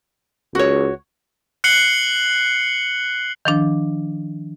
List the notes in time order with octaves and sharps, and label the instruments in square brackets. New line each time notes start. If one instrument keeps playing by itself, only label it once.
[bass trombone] C#2 [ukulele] F#4 C#5
[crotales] F#6 C7 C#7 F#7 G7
[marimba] D#3 F3 D4